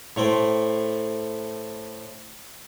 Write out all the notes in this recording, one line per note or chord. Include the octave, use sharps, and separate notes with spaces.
A2 A3 C5 G5